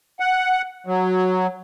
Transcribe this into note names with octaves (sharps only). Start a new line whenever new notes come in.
F#5
F#3